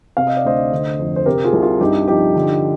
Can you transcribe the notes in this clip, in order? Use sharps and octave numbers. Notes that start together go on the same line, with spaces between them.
C3 F5
D#5
D5
D2 C5 D#5
D3
F2
C5
C3 G4 A#4
F4 G#4
C2
F4
G2 D#4 G4
F3 D#4 G4
D3